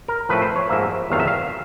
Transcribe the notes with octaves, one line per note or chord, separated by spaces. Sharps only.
A#4
A2 F3 A3 C4 B4
C5
C#5
G#2 F3 A#3 E5
E2 C3 D#3 F#3 A3 F5
E5
F5